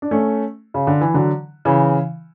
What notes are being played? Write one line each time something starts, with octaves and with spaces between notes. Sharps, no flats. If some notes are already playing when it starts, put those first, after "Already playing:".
D4
A3 C#4
C#3
D3
E3
D3 F#3
C#3 E3